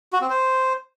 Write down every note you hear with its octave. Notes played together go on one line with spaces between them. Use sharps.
F#4
C4
C5